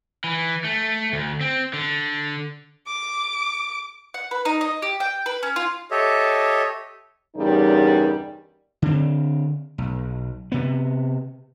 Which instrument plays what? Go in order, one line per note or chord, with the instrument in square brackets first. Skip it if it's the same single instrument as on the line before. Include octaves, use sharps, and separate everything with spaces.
[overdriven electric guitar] E3
A3
D2
C4
D3
[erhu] D6
[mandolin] F#5
B4
D#4
D#5
G4
G5
B4
C#4
F4
[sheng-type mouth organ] G4 A4 C#5 D#5 E5
[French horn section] E2 G2 C#3 G3 D#4 A#4
[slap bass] D3 C4
B1
C3 B3